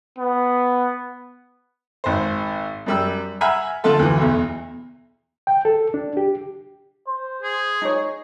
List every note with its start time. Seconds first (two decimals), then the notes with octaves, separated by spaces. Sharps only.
0.19 B3
2.04 G#1 C5
2.86 F#2 G3 E6
3.41 E5 F#5 G#5 A#5 B5 F6
3.84 D3 F3 A3 F4 A4
3.99 D2 E3
4.18 B1 E2
5.47 G5
5.65 A4
5.94 D4
6.17 G4
7.08 C5
7.43 G#4
7.82 D#4 C#5